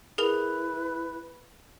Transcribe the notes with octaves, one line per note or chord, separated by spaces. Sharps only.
E4 G#4 A#4 B4 B5 F7